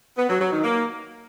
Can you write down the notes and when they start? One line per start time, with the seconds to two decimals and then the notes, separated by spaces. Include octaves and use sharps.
0.18 B3
0.29 F#3
0.41 F#3
0.52 D#3
0.63 A#3